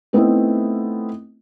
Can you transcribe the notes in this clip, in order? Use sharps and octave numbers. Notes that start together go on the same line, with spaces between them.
A3 B3 C4 D#4 E4